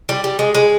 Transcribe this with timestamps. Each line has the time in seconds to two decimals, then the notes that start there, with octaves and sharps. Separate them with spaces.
0.09 G3
0.24 G3
0.39 G#3
0.55 G#3